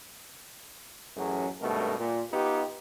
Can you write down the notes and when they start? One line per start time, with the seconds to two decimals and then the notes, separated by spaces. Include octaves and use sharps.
1.16 A1 F#2 F#3 C#4 G#4
1.61 G#1 G2 B2 A3 A#4
1.98 A#2
2.32 B3 D#4 F4 G4